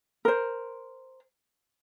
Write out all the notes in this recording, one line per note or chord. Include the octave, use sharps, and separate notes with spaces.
A#4 C5